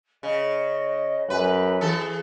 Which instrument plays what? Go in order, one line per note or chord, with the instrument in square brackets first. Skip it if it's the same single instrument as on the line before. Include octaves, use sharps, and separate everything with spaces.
[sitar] C#3 [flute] D#5
[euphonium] F#2 [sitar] B4 [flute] G#5
[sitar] E3 A4 [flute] G#4